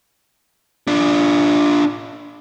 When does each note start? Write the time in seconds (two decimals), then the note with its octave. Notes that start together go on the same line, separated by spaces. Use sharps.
0.87 D4 F4